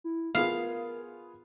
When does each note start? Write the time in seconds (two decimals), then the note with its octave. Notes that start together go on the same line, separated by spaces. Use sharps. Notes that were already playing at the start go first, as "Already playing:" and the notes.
0.04 E4
0.35 B3 F4 G#4 A#4 F5